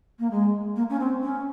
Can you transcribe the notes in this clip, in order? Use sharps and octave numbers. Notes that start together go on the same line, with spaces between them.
A#3
G#3
A#3
C#4
C4
C#4